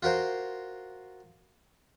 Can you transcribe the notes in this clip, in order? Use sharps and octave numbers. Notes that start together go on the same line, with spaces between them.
F4 F#4 A#4 C5